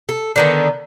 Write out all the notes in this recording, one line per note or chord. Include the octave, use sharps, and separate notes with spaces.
A4
D3 D#3 B3